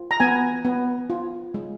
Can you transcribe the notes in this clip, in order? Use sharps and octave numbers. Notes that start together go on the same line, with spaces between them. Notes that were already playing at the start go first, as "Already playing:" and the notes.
Already playing: F4
A#5
B3 G#5
B3
F4
G#3